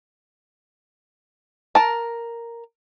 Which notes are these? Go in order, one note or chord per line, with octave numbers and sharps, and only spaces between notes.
A#4 A5